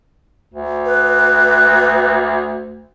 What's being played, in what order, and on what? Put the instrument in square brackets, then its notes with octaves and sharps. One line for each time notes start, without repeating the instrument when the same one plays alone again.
[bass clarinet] D2
[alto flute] B4